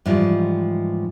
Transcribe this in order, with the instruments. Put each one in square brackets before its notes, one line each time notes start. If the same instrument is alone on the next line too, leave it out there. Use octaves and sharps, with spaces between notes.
[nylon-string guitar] G#2 E3 F3 G3